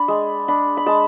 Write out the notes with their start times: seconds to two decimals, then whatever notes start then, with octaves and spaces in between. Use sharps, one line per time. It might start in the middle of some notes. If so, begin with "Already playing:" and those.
Already playing: D4 B5
0.08 G#3
0.48 D4 B5
0.77 B5
0.86 G#3 A5